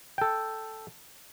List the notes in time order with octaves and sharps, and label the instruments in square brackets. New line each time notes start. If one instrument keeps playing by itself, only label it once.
[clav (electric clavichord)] A4 G5